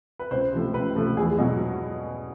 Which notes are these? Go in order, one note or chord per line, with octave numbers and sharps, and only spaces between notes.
B4
C#2 C5
C3 F3 A3
C#2 B4
C3 F3 A3
E2 G#4
B2 F#3 B3